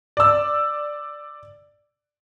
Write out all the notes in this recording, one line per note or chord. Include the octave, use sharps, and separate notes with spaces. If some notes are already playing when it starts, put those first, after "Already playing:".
D5 E6